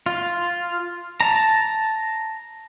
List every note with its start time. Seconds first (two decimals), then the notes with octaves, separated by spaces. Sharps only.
0.06 F4
1.21 A5 A#5